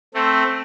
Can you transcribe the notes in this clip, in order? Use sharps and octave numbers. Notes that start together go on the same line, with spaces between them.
A3 C4